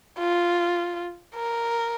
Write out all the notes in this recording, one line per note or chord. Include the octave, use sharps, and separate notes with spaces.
F4
A#4